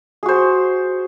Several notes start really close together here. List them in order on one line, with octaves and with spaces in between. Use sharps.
G#4 F#4 C5